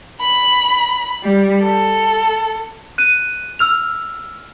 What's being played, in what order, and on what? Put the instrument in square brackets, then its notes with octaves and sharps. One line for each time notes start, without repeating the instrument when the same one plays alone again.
[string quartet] B5
G3
A4
[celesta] F#6 D#7
E6 F6 F7